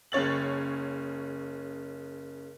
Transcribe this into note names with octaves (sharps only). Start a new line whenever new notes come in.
F#1 C#3 C#5 A6 F#7